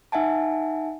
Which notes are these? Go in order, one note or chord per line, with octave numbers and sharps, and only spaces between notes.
D#4 E5 F#5 G#5 A5